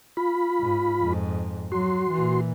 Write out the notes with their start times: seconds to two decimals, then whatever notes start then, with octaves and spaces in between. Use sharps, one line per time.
0.17 F4 B5
0.59 G#2
1.01 F2 G#2
1.72 F#3 F#4 C6
2.11 A#2 E3